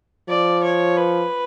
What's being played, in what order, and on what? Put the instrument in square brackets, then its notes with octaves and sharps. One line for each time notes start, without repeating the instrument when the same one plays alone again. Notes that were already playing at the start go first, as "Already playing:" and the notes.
[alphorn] F3 [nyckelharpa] D5
[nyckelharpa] C#5
B4